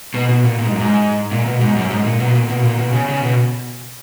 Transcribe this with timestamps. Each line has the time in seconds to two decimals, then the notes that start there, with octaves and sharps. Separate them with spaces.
0.14 B2
0.29 B2
0.44 A#2
0.58 A#2
0.65 G#2
0.72 F#2
0.80 G#2
1.32 A#2
1.46 B2
1.61 G#2
1.76 F#2
1.90 G#2
2.05 A#2
2.20 B2
2.35 A#2
2.49 B2
2.63 A#2
2.78 B2
2.93 C#3
3.09 C#3
3.22 B2